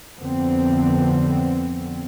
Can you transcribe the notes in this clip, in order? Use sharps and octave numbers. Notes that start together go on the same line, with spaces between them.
F2 D3 B3 C4